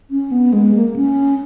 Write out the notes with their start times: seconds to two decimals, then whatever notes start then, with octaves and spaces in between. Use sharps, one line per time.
0.11 C#4
0.32 B3
0.53 G#3
0.75 A#3
0.96 C#4